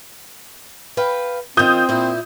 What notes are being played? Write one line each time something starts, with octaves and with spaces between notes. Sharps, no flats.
B4 F5 G5
D#3 C4 F4 D#6 G6
A#2 E4